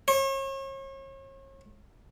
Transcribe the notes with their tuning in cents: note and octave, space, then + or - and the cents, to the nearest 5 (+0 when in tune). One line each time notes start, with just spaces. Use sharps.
C#5 -40